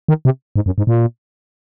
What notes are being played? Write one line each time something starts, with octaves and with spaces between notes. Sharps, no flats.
D#3
C3
G#2
F#2
G#2
A#2